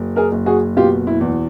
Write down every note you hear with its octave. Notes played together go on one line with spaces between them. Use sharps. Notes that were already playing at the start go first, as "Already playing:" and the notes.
Already playing: F#1
G#4 A#4
F#1
F#4 G#4
B2 F4 G4
E4
E2